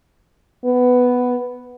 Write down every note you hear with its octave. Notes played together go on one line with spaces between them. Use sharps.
B3